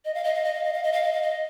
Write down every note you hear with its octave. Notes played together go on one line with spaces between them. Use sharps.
D#5
F5
D#5
F5
D#5
F5
D#5
F5
D#5
F5
D#5
F5
D#5